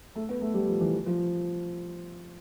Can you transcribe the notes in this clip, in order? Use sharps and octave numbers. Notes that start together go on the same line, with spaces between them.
A3
B3
A3
G3
F3
E3
F3